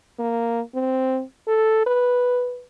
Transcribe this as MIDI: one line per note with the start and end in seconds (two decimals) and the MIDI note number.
0.19 0.61 58
0.75 1.22 60
1.47 1.84 69
1.86 2.64 71